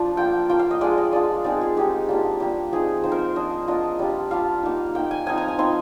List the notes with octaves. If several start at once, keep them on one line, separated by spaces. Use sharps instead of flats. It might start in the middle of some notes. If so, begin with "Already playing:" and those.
Already playing: F3 D4
A#3 F4 G5
A#3 F4 G5
F5
D#5
G#3 D4 F4 D5
D#5
G#3 D4 F4 D5
G#3 C4 D#4 D5
G#4
G#3 C4 D#4 G4
G3 A#3 D4 F4
G3 A#3 D4 G4
F3 C4 D#4 G#4
F3 C4 D#4 C5
A#4
C5
A#3 D4 F4 D#5
A#3 D4 F4 D#5
G3 D4 F4
G3 D4 F4 F5
A#3 D#4
A#3 D#4 G5
G#5
F3 C4 D#4 G#5
A#5
G#5
F3 C4 D#4 C6